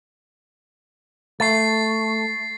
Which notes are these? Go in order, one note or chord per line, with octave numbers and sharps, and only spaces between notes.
A3 A6 C7